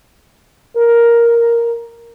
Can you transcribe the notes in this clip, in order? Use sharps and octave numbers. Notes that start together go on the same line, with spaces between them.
A#4